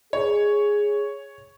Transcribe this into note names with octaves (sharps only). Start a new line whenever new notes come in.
G#4 C#5